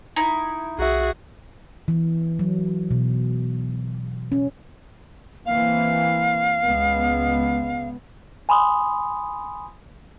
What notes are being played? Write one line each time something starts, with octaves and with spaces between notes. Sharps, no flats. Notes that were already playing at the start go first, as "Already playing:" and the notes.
D#4 E4
B1 F#4 G#4 E5
E3
F#3
B2
C#4
E3 A#3 C4 F5
C#2 G#3 B3
G#5 B5 C6 D#6